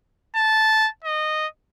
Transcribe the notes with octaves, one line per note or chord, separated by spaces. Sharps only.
A5
D#5